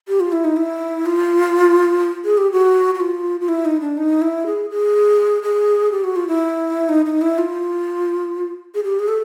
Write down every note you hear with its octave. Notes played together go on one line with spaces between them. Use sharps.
G4
F4
E4
D#4
E4
F4
G#4
G4
F#4
F#4
F4
F4
E4
D#4
D4
D#4
E4
G#4
G#4
G#4
G4
F#4
F4
E4
D#4
D#4
E4
F4
G#4
G4
G#4
A4